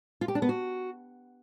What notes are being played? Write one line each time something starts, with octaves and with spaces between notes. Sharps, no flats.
F4
G4
D4
B3
F#4